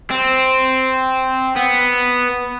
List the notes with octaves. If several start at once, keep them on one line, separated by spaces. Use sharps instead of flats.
C4
B3